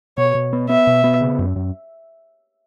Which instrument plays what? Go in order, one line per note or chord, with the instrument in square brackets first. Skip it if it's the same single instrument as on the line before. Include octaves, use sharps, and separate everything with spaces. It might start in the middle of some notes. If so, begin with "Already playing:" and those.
[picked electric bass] B2 [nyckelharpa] C#5
[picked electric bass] B2
B3
[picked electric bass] B3 [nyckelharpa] E5
[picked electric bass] B2
B3
C#3
F#2
F#2